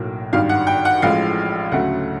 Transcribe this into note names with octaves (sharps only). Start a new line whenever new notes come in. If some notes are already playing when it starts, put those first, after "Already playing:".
Already playing: B1 A2 F#3 A#3
G#1 G2 D#3 F5
F#5
G5
F#5
A1 A2 F3 G#3 F5
D2 C#3 F#3 A3 F#5